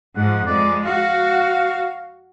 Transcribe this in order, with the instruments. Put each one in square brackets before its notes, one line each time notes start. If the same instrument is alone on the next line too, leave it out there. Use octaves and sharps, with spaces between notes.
[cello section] G#2 F3 [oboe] F#5
[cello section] F2 G#3 [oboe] D5
[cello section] F#4 [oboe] F5